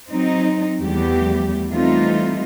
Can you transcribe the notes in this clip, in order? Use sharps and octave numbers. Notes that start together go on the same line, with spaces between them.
F#3 C4 D#4
E2 F3 G3 A3 B3 G4
E3 G3 A3 C4 D#4 F4